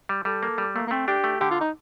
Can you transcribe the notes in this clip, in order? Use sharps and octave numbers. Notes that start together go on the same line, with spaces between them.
G3
G3 A4
A#3
G3
A3 A#3
A#3
A3 C4
D4 G4
A3
D3 G4
F4
D#4